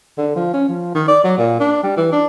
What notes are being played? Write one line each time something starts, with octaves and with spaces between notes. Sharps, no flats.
D3
F3
C#4
F3
D#3
D5
F#3
A#2
D4
G3
E3
D4